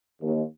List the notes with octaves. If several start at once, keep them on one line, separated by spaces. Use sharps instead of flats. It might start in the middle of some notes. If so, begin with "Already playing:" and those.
D#2